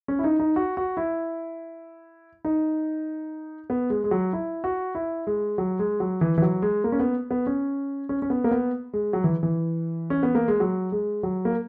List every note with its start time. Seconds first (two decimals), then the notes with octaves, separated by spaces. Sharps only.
0.08 C#4
0.19 E4
0.24 D#4
0.40 D#4
0.56 F#4
0.77 F#4
0.97 E4
2.45 D#4
3.70 B3
3.90 G#3
4.04 G#3
4.11 F#3
4.33 E4
4.64 F#4
4.95 E4
5.27 G#3
5.58 F#3
5.79 G#3
6.00 F#3
6.21 E3
6.38 E3
6.42 F#3
6.62 G#3
6.84 A#3
6.92 C#4
7.00 B3
7.31 B3
7.47 C#4
8.09 C#4
8.22 C#4
8.30 B3
8.44 A#3
8.51 B3
8.93 G#3
9.13 F#3
9.24 E3
9.43 E3
10.10 C#4
10.23 B3
10.35 A#3
10.48 G#3
10.60 F#3
10.92 G#3
11.23 F#3
11.45 A#3